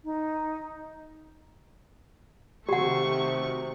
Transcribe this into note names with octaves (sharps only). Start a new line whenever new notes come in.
D#4
C3 D#3 A3 F#4 G4 F#5 C#6